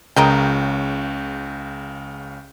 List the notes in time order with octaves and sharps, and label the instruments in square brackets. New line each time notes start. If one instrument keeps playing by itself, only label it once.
[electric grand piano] C#2 C#3 [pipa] A#4 D#5 G5